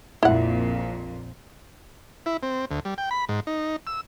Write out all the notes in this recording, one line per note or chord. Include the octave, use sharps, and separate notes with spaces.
A#1 F2 A#2 E4 F#5
E4
C4
D2
G3
G5
B5
G#2
D#4
E6